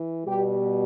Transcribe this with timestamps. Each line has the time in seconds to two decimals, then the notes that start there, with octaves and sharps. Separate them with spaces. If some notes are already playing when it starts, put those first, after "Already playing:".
Already playing: E3
0.24 B2 G3 G4